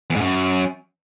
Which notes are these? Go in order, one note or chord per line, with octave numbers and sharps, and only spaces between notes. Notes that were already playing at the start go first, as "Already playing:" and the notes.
E2
G#2
F#2